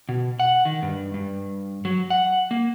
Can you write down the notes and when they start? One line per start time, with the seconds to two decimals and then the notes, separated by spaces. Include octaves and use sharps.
0.09 B2
0.40 F#5
0.65 D#3
0.82 G2
1.14 G2
1.85 F#3
2.10 F#5
2.51 A#3